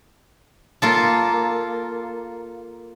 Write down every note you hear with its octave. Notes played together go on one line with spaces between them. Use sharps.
A#3 F4 A4